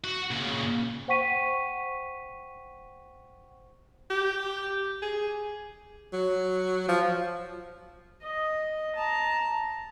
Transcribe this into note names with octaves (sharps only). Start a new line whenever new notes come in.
F#4
A#2 C#3
C5 F#5 G5 C#6 B6 D#7
G4
G#4
F#3
F3
D#5
A5 A#5